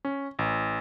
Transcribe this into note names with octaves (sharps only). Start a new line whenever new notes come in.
C#4
A1